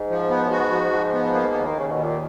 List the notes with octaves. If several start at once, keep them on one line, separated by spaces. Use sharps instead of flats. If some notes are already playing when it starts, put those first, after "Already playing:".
Already playing: G#2
F3
B3
F#2
G#2 F#4
F3
F3
B3
A#3
D#2
D#3
D#2 C#3
B2 D#3
A#2